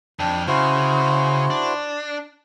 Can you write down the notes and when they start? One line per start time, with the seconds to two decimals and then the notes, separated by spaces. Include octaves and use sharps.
0.19 F2 D4 G5
0.48 C#3 E4 F#4 C5
1.50 D4